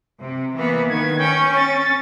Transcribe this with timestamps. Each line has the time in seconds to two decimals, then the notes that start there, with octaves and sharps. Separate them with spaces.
0.21 C3
0.55 E3 A#3 B3
0.89 D#3 B3 G#6
1.19 C#4 G5
1.56 A6